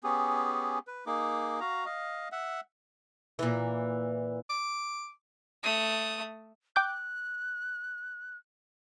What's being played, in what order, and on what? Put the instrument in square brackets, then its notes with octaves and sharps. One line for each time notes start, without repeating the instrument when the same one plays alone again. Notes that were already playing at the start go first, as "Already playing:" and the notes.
[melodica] B3 C#4 G4 G#4
B4
A#3 D#4 G#4 D6
F#4 F5 A#5
D#5 F5
E5 F#5
[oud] A#2 E3
[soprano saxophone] D6
[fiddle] A3 D#6
[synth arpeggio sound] G5 D6 G6 [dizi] F#6